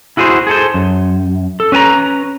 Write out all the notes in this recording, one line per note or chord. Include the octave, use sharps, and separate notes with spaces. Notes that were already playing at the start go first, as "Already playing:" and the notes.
E4 F#4 G#4 A4 C5
G#4 A4 C5
F#2
A4
C#4 B4 G#5 A#5